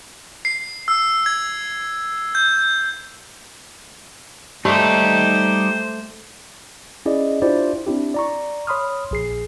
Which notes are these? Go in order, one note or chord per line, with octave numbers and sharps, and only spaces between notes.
C7
E6
G#6
G6
G3 A3 D#4 G4 C5
C#4 E4 G#4 D5 D#5
D4 E4 F4 G4 C5 D5
C4 D4 E4 G4
D5 A#5 C#6
C#5 B5 C6 D#6 F6
A#1 G#4 C7